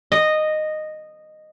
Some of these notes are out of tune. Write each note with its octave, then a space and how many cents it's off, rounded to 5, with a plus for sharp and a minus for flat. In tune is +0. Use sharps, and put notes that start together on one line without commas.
D#5 -10